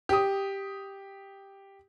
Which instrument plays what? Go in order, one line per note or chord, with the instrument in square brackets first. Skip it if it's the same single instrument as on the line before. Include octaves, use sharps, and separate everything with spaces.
[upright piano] G4 D#6